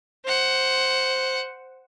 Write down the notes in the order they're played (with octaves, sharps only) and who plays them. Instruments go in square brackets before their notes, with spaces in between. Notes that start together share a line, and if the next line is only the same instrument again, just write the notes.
[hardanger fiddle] C5 F#5